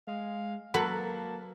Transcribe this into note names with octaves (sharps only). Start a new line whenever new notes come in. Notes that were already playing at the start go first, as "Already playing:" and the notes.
G#3 F5
F#3 A#3 F#4 A4 B4 F#5 A5 B5